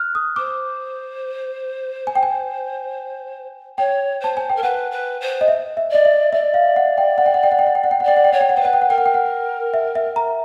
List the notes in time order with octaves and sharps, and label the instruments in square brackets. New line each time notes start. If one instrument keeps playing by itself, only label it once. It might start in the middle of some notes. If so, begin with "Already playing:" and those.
Already playing: [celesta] F6 F#6
D#6
[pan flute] C5 [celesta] D6
[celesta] G#5
G5
G#5
[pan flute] C#5 [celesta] G5
[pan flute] C5 [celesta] A5
[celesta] G#5
G5
[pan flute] A#4
[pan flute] B4 [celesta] F#5
[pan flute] B4
C5
[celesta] D#5
E5
E5
[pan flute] D5 [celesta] D#5
[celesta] E5
[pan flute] D5 [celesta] E5
[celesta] F5
F#5
G5
F#5
G5
F#5
G5
F#5
G5
F#5
G5
F#5
G5
F#5
[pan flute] D5 [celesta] G5
[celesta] F#5
G5
[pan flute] C#5 [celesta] F#5
[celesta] G5
F#5
[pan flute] C5 [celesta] G5
[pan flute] B4 [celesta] F#5
[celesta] G5
F#5
[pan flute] A#4 [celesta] G5
[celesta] F#5
G5
F#5
E5
E5
A#5